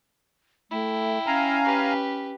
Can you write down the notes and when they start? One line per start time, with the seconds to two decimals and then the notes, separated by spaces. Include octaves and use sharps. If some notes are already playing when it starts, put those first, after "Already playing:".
0.71 A3 E4 G5
1.27 C#4 F5 G#5 A#5
1.64 G4 B4